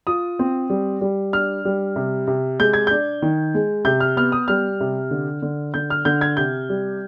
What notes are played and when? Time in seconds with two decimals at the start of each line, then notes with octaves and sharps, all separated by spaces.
0.07 F4 D#6
0.39 C4
0.70 G3
1.01 G3
1.33 D4 F6
1.65 G3
1.96 C3
2.27 C3
2.60 G#3 G6
2.73 G#6
2.87 D4 G6
3.22 D#3
3.54 G#3
3.85 C3 G6
4.00 F6
4.16 B3 F6
4.32 D#6
4.48 G3 F6
4.80 C3
5.11 D3
5.42 D3
5.74 D3 G6
5.90 F6
6.05 D3 G6
6.21 G#6
6.37 C3 G6
6.69 G3